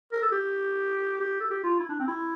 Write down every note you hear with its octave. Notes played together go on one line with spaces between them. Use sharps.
A#4
A4
G4
G4
A4
G4
F4
E4
D4
C4
E4